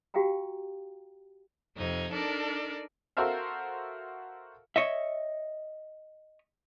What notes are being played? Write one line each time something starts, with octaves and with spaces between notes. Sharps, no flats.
F#4 G4 F5 G5 G#5 A#5
F2 C3 F3 D#4 G#6
D4 D#4 A4 A#4 D5
F#4 A4 A#4 C5 E5 F5
C#5 D#5 E5